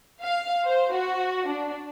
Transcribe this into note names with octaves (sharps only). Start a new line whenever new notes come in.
F5
C5
F#4
D4